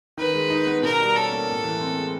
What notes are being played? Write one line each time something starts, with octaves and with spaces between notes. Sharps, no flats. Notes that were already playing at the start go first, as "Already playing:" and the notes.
D#3 B4
G#3
D#4
B3
B2 A#4
G3
C#4 A4
A#3
A2
E3
C4
G#3